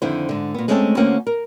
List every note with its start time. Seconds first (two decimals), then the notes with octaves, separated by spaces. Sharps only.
0.02 F2 D3 D#3 E4 C5
0.29 G#2 D3
0.54 A#2 B3
0.68 G#3 A3 C4 C#4 G4 A4
0.97 D2 A#3 C#4 C5 F#5
1.27 A#4